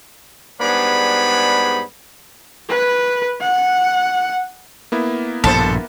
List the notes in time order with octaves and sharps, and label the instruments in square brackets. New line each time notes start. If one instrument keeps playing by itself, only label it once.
[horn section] G#2 G3 B3 D4 G#4 B5
[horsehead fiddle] B4
F#5
[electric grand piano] A#3 B3 E4
[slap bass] A#1 G2 B2 [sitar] D4 A4 C5 [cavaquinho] A5